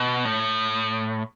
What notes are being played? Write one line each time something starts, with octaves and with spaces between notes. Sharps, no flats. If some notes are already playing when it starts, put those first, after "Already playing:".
Already playing: B2
A2